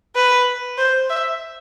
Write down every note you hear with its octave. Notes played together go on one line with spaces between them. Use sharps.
B4
C5
E5